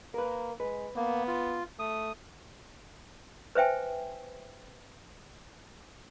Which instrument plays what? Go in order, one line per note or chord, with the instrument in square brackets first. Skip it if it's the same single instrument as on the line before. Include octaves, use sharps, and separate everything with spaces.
[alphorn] A#3 [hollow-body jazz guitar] A#4 B4
[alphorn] G#3 [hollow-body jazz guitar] B4
[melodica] A#3 [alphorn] B3
[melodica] F4
[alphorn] A3 [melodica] D#6
[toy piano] B4 C5 E5 G5 G#5